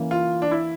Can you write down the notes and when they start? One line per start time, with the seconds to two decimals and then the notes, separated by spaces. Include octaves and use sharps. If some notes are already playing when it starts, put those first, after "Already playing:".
Already playing: E3 A#3 C#4
0.11 F4
0.42 D4
0.51 E4